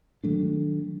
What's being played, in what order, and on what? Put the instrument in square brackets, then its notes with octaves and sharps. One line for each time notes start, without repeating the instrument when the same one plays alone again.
[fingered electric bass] D#3 F#3 A3 D4